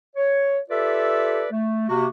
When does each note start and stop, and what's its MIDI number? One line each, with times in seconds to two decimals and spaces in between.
0.16 0.58 73
0.70 1.47 65
0.70 1.47 67
0.70 1.47 69
0.70 1.47 71
0.70 1.47 74
0.70 1.47 76
1.52 1.87 57
1.89 2.07 48
1.89 2.07 58
1.89 2.07 66